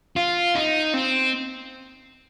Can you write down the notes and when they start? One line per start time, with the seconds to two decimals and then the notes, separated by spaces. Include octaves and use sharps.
0.16 F4
0.55 D#4
0.94 C4